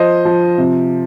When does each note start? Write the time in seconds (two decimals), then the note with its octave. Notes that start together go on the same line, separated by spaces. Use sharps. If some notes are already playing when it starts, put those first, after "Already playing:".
Already playing: F3 C5 D#5
0.25 F3
0.58 C3